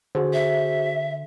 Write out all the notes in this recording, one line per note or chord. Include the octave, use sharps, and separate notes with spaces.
D3 F#4 G#4 C5
E5